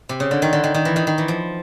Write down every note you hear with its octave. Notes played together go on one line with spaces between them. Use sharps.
C3
C#3
D3
D#3
D3
D#3
D#3
E3
D#3
D#3
E3
F3